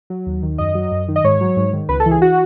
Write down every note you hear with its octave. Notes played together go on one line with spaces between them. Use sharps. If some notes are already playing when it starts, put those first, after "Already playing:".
F#3
D#2
D#3
F#2 D#5
F#3
F#2
D#3
D#5
G#2 C#5
F#3
G#2
D#3
C#2 B4
A4
E3
G#4
F#4